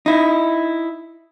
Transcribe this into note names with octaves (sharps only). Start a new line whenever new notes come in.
D#4 E4